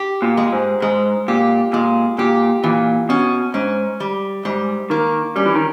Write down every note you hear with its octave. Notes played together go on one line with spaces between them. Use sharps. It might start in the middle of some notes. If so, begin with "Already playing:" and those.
Already playing: G4
A#2
G#3
G#2
G#2 G#3
A#2 G4
A#2 G#3
A#2 G4
A#2 E3
B2 C#4
G#2 C#4
G3
G#2 G3
D#3 A#3
G3 C#4
E3
D#3